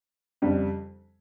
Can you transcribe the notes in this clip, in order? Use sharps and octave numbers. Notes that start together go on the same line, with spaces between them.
F2 C#3 G3